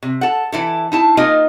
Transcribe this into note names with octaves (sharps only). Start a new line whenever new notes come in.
C3
A4 F#5
E3 E4 A4
D#4 E4 A5
A#3 D#4 F4 D#5 G#5